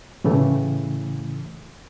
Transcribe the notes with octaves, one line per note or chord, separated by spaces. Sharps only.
A2 C#3 E3 A3